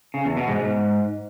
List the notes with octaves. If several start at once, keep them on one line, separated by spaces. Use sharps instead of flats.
C#3
E2
B2
G#2
G#2